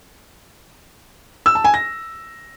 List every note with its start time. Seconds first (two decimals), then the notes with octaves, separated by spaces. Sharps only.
1.46 E6
1.55 A5
1.64 G#5
1.74 A#6